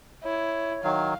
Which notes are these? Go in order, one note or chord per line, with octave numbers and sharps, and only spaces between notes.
E4 C#5
D#3 F#3 F5